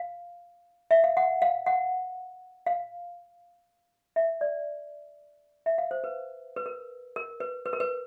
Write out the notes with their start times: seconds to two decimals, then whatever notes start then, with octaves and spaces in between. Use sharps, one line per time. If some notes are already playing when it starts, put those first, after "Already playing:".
Already playing: F5
0.91 E5
1.04 F5
1.17 F#5
1.42 F5
1.66 F#5
2.66 F5
4.16 E5
4.41 D5
5.66 E5
5.78 F5
5.91 C5
6.04 B4
6.56 B4
6.66 A#4
7.16 A#4
7.40 B4
7.66 B4
7.73 A#4
7.80 B4